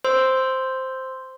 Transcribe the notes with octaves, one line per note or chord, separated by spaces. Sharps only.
C5 C6 E6